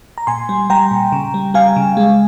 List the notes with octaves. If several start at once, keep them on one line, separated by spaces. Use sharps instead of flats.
A#5
A#2 G#5 C6
G3
G3 G5 A#5
A#2
C#3
G3
G3 F5 G#5
C#3
G#3